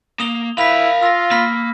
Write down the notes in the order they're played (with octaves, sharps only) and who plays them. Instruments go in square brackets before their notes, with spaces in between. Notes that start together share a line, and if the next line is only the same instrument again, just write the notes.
[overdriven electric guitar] A#3 [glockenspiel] D#6 F7 G7
[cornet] E4 [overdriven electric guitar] A#4 B5 [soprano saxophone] F5 [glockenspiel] B6 F7
[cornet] F4 [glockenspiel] E6 A#6
[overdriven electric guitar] A#3 [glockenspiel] B5 F6 B6